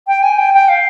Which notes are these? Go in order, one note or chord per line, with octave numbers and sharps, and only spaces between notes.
G5
G#5
G5
G5
F5